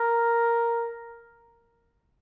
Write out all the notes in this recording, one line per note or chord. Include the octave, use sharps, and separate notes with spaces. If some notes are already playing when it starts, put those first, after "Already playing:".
Already playing: A#4